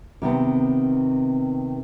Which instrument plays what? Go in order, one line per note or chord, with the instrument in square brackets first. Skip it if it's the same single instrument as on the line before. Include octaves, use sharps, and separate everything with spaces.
[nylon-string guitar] C3 D#3 B3 C4